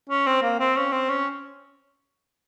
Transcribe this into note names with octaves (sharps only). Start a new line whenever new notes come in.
C#4
C4
A#3
C4
C#4
C4
C#4